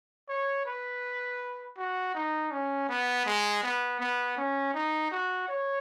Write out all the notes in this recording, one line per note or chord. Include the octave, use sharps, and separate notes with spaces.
C#5
B4
F#4
D#4
C#4
B3
G#3
B3
B3
C#4
D#4
F#4
C#5